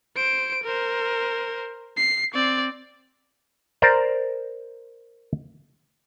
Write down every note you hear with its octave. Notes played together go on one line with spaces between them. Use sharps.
C5 D7
A#4 C5
C7
C4 D5
A#4 C5 D5 A#5